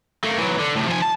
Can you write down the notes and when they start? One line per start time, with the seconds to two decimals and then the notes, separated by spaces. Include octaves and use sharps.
0.24 A3 A#3
0.38 E3 F#3
0.59 D3
0.76 A2 C3
0.88 F3 G#5
1.02 A5